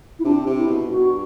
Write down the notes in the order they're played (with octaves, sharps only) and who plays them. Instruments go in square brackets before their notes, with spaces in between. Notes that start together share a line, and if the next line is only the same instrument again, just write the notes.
[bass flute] E4
[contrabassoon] C3 [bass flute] D4
[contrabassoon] C3
[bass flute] E4
[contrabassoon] B2
[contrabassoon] G2 [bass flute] F#4